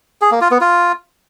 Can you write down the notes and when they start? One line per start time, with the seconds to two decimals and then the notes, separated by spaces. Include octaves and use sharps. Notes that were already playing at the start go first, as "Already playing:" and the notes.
0.21 G#4
0.31 A#3
0.41 F4
0.51 B3
0.61 F4